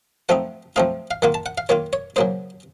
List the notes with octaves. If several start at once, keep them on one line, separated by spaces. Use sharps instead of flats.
F3 A3 C4 D#4 F#5
F3 A3 C4 D#4 F5
F5
D#3 A#3 F4 F#5
A5
F#5
F5
D#3 A#3 F4 C#5
C#5
C#3 F#3 A#3 D#4 C5